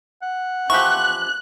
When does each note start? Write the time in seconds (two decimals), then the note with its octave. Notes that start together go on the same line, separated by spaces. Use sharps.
0.23 F#5
0.70 E3 F3 G4 C#6 F#6